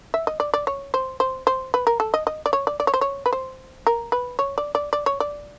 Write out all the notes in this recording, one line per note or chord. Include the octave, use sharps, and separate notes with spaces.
E5
D#5
D5
D5
C#5
C5
C5
C5
B4
A#4
A4
D#5
D#5
D5
C#5
D5
D5
C#5
C5
C#5
B4
C5
A#4
B4
C#5
D5
D5
D5
C#5
D5